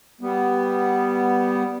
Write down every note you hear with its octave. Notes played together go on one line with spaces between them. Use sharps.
G3 B3